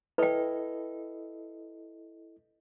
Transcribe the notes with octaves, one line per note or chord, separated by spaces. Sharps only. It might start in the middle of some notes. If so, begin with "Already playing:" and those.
E4 A4 B4 D#5 G5